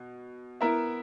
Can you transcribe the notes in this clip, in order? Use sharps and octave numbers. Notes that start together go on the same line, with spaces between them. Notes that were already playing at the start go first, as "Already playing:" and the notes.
Already playing: B2
B3 E4 A#4 E5